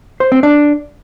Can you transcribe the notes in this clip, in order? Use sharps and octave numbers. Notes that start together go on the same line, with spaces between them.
C5
C4
D4